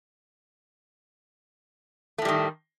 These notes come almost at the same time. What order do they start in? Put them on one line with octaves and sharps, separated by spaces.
A3 A2 G3 D#3